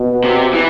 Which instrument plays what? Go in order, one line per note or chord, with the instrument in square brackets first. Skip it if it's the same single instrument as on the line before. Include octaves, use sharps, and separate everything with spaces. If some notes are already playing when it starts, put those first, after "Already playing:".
Already playing: [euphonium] B2
[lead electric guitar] C3
E3